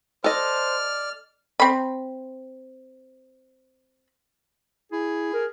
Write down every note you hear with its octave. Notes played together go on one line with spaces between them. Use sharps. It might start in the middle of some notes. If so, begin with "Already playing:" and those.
A4 C5 D5 D#5 F6
C4 B5
E4 G#4
A#4